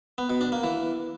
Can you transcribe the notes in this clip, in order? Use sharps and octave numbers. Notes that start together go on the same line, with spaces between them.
B3
B2
D4
A#3
E3